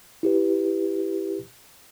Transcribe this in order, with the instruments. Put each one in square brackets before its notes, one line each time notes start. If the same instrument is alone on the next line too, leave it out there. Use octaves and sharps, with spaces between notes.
[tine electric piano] E4 G4 B4